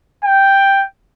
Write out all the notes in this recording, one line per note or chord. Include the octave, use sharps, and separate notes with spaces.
G5